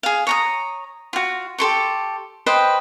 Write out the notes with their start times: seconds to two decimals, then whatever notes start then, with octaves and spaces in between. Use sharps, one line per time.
0.03 G#4 F5
0.27 C#5 A#5 D#6
1.13 F4 F#4
1.58 G4 A4 C6 C#6
2.46 B4 C5 D#5 G5